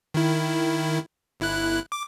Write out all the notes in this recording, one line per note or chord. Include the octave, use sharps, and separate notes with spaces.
D#3 E4
G1 E4 F#6
D6